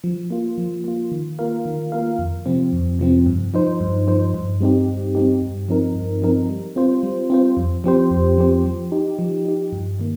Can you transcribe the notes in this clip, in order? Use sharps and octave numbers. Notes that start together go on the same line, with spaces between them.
F3
A#3 F4
F3
A#3 F4
D#3
A#3 F4 A#4 F5
D#3
A#3 F4 A#4 F5
F2
C3 F3 C4
F2
C3 F3 C4
G2
F3 D#4 C5
G2
F3 D#4 C5
G2
G3 C4 D#4 G4
G2
G3 C4 D#4 G4
G2
F3 C4 D#4 A#4
G2
F3 C4 D#4 A#4
G3
C4 F4 C5
G3
C4 F4 C5
F2
F3 C4 G4 C5
F2
F3 C4 G4 C5
F3
D#4 G4
F3
D#4 G4
G2
D#3 A#3